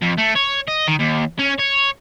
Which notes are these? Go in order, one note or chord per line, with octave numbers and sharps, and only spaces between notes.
F2
A3
C#5
D#5
D#3
D#2
C#4
C#5